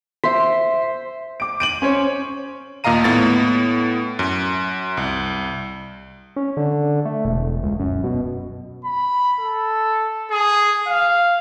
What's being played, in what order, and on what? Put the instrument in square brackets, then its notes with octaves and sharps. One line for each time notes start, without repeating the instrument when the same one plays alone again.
[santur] C5 [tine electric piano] E5 B6
[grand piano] D6 D7
D7 D#7 F#7
C#4 C5 C#5
[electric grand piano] D#2 A#2 D#5 F5 A#5 D#7
A2 B3 A6
F#2
C2
[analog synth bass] C#4
D3
A3
E1
C#2
F#2
B2
[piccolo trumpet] B5
A4
G#4
F5